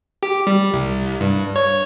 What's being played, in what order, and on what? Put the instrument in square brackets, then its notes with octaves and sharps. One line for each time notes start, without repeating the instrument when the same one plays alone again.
[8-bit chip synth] G4
G3
C2
G2
C#5